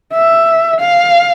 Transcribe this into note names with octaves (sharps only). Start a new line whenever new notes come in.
E5
F5